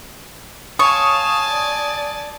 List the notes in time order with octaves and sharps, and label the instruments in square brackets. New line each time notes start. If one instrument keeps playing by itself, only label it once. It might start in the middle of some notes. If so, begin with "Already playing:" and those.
[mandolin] C#5 C#6 [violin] F5 E7 [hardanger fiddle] G#5 A5 [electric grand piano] D#6
[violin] D5